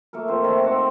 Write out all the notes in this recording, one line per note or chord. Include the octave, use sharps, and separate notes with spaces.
A3 A#3 A4 A#4
F3 C4 C5
D#3 A3 A#4
C4 A4 F#5 D6